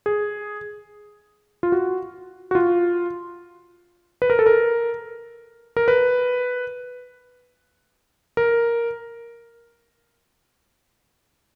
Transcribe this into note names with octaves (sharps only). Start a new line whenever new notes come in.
G#4
F4
F#4
F#4
F4
B4
A#4
A4
A#4
A#4
B4
A#4